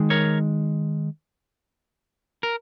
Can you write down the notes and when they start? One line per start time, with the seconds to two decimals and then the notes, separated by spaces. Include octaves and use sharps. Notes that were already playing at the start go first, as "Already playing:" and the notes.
Already playing: D#3 G#3
0.10 A#4 C#5
2.43 A#4